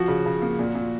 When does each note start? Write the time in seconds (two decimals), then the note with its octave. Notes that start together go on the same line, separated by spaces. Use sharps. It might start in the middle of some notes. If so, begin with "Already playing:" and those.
Already playing: F3 F#4
0.08 C#3
0.26 C#3
0.42 A#3
0.59 A#2
0.75 A#2